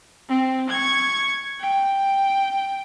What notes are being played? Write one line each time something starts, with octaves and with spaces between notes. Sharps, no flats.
C4
C#6 G#6
G5